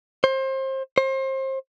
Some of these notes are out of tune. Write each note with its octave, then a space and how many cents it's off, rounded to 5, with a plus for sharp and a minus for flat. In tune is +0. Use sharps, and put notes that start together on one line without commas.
C5 +30
C5 +30